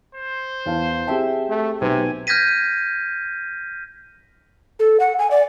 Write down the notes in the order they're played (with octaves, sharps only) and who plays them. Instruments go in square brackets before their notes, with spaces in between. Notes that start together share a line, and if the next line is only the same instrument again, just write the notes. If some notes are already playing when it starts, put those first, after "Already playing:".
[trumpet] C5
[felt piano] E2 F5 A5
[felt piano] C4 G4 G#4 [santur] E5 G5 A5
[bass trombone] A3
[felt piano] B1 B4 [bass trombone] C3 [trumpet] G#5
[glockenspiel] F6 G6 G#6 A#6 B6 D#7
[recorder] A4
F#5
G#5
D5